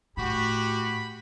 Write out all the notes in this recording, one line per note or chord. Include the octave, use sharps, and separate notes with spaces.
A2 F#4 G4 B5